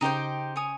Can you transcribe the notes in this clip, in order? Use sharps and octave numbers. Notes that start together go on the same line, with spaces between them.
C#3 D#4 G4 C5 G5
C#5 G#5 D#6